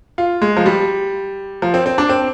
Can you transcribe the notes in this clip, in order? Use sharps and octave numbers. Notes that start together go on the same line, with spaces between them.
F4
G#3
F3
G3
F3
C4
C4
D4
C4